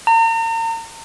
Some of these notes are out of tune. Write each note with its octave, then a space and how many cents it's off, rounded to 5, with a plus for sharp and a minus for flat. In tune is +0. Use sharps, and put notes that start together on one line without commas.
A#5 -40